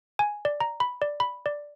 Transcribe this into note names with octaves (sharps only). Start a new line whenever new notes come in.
G#5
D5
A#5
B5
D5
B5
D5